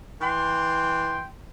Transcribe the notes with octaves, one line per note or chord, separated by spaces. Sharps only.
E3 G5 C6